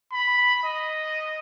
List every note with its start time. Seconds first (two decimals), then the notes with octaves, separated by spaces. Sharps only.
0.13 B5
0.64 D#5